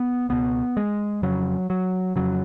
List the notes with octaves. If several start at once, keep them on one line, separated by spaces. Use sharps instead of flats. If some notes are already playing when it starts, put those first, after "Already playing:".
Already playing: B3
C#2 B2 B3
G#3
F2 C#3 F#3
F#3
F2 C#3 F#3